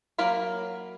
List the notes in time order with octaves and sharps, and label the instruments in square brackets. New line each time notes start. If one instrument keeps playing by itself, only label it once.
[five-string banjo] F#3 A#3 A#4 F5 B5